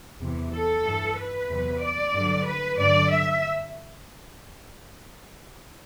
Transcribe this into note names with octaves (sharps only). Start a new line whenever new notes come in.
E2 C3 E3
A4
G2 E3
B4
E2 C3 F#3
D5
G2 D3 F#3
B4
G2 D3 F#3 D5
E5